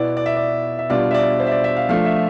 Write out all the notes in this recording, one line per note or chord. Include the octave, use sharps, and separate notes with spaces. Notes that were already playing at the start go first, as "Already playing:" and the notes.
Already playing: B2 B3 E4 D5
D5
E5
D5
E5
B2 G3 D4 F4 D5
E5
D5
C5
E5
D5
E5
F5
F3 A3 D4 F4 F5
E5